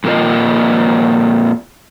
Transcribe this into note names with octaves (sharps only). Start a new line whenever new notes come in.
F2 A#2 A#3 F4 D#5